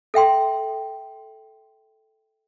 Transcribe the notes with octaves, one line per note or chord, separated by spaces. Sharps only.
A4 E5 G5 C6